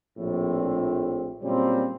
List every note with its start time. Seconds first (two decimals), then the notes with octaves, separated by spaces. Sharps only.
0.18 A#1 A2 C4
1.43 A#2 C#3 F#3 G3 A#3 C4